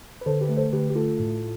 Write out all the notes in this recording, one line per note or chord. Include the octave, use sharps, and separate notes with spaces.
B4
D3 A4 C5
G4 B4
A3
A4 C5
D3 G4 B4
G4
A3 F4 A4
A2